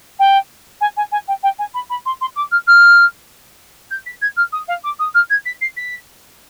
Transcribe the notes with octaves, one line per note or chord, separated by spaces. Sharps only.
G5
G#5
G#5
G#5
G5
G5
G#5
B5
B5
C6
C6
D6
F6
F6
G6
B6
G#6
F6
D#6
F5
D6
D#6
F6
G#6
B6
C7
B6